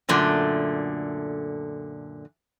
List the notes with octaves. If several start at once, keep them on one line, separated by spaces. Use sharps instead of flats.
F#2 A#2 D3 A3